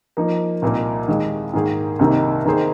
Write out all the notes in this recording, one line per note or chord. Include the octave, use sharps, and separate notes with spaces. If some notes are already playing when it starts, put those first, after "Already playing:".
F3 A#3 D#4
C2 A#2 A#3 D#4
D#2 D#3 G#3
G#2 D#3 A#3 G#4
C2 C3 D#3 A#3 D#4
D#3 A#3 D#4 G#4 C5